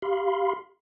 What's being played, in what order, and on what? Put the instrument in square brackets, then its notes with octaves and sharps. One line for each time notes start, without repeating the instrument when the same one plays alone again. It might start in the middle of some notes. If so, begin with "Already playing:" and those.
[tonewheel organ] G4 F5 B5 C6